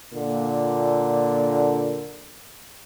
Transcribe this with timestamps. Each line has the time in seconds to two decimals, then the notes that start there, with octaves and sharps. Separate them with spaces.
0.13 A#2 D3